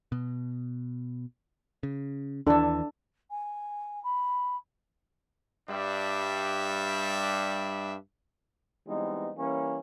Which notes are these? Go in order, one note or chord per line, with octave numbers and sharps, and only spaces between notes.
B2
C#3
D#2 E3 D4 A4
G#5
B5
G2 G3 D4 E5
E3 G3 G#3 B3 C4 D#4
E3 G3 A#3 C#4